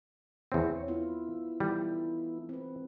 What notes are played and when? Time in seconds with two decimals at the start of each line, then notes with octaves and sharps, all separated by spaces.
0.52 E2 C4 C#5
0.88 B3 E4 F4
1.60 E3 G3 D#4 A4
2.49 C4 B4